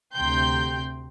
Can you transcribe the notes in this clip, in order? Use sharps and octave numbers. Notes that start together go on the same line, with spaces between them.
D2 C3 G5 A#5 C6 G6